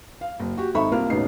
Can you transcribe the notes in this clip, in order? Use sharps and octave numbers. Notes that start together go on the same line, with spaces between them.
F5
F#1
F#4 G4
G#1 D#4 A4 E5 B5 C#6
C2 A#3 F4 F6
E1 A1 C#3 B3 D#4 C7